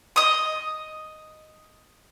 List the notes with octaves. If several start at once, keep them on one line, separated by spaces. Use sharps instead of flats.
D#5 D#6